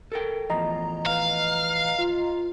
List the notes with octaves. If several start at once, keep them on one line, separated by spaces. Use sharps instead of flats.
A4 A#4 G5
E2 A2 F3 D#5 A#5
B4 F5
F4